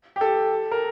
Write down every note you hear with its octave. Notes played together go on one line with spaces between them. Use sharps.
G4
A4
A#4